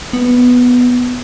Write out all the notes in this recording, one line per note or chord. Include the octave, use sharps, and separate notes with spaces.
B3